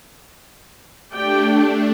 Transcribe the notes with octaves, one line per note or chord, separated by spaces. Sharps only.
A3 D4 G4 D5 G5